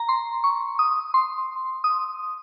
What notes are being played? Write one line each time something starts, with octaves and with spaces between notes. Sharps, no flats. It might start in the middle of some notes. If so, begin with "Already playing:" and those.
Already playing: A#5
C6
C#6
D#6
C6
D#6